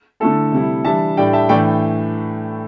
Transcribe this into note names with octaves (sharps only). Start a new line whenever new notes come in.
D3 A3 E4 A4
C3 G3 E4
E3 G3 D4 E5 A5
A2 G3 D4 D5 G5
E5 A5
A2 E3 A3 D4 D5 G5